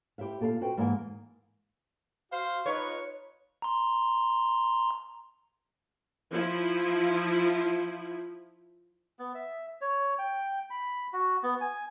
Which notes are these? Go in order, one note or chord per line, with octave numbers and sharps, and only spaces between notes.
E4 G4 C5 E5 F5
A#2 A4 A#4 F5
F#4 B4 C5 G5
G#2 E3 A#3 A#4 D#5 G#5
F#4 C5 F5
D#4 F4 B4 C#5
A#5 C6
F3 E4
B3
E5
C#5
G5
B5
F#4
B3
G#5